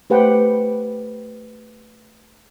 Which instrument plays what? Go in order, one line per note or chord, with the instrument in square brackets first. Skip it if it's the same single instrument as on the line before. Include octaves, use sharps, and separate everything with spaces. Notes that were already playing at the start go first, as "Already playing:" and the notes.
[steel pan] A3 G4 B4 C5 F#5 G5